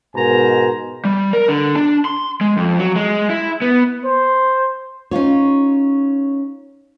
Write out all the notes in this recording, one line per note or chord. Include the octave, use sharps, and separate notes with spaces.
G#2 B2 A#4 C5 G#5 A#5
G3
A#4
D3
D4
C6
G#3
F2
F#3
G#3
E4
B3
C5
C#4 D#4 F4 C#5